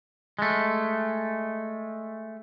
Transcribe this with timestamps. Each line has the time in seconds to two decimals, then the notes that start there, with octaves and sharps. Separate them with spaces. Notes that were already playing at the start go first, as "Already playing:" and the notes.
0.39 G#3 A3